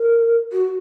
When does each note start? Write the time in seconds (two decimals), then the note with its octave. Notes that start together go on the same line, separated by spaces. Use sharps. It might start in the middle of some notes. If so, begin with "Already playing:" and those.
Already playing: A#4
0.52 F#4